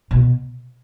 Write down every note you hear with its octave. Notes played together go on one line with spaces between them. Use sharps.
B2